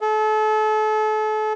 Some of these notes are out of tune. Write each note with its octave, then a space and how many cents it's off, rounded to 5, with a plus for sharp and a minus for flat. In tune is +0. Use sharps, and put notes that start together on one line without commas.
A4 -35